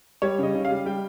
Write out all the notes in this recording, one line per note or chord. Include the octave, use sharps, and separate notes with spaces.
G3 C#5
C#3 D#5
C#3
F5
G3
G3 G5